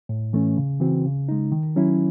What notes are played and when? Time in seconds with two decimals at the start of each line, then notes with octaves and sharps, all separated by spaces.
0.09 A2
0.33 E3 A3 C#4
0.57 C#3
0.80 E3 C4 F#4
1.05 C#3
1.29 G#3 D#4
1.52 D#3
1.76 F#3 C#4 E4